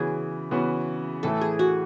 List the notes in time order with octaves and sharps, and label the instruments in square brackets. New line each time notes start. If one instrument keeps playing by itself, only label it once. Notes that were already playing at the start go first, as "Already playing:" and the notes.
Already playing: [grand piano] C#3 E3 B3 F#4 [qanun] G#4
[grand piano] C#3 E3 B3 F#4
[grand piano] A2 E3 A3 [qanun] A4
[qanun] G#4
F#4